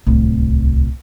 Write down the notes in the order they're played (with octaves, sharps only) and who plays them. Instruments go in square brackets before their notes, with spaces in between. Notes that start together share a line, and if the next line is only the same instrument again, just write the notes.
[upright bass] D1 C2